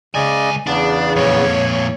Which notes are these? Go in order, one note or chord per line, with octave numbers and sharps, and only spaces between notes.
C#2 C#3 D5 D#5 G#5
E2 C#3 B3 D4
F2 A#2 C#5